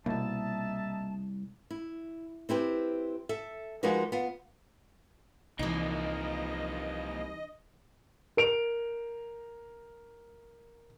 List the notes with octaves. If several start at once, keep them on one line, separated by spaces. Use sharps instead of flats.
C2 B2 A#3 D#4 E5 A5
E4
C4 E4 G4 B4
A4 E5
F3 G#3 D#4 F#4 A#4 B4
B3 F4
C2 E3 F3 A#3 D#4 D#5
A#4 D7 F7